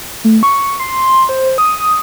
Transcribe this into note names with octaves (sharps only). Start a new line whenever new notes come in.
A3
C#6
C6
C5
D#6